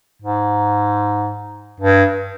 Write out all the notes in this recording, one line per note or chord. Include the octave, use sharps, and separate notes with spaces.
G#2
G2